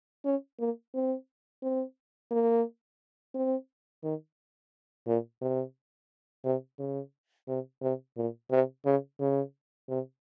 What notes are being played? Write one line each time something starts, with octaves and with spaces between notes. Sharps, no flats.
C#4
A#3
C4
C4
A#3
C4
D#3
A#2
C3
C3
C#3
C3
C3
A#2
C3
C#3
C#3
C3